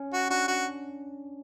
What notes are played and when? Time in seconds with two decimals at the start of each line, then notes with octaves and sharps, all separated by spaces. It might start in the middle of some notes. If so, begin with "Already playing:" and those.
Already playing: C#4
0.13 F#4
0.30 D4 F#4
0.48 F#4